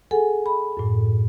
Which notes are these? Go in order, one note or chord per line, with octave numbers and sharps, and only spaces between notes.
G#4 A4 F#5 G#5
B5
F#2 A2